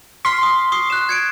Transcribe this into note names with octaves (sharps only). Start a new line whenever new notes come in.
C6 F6 B6
D#6
C#6 D#6 C7
F#6 E7
G#6 C#7 D7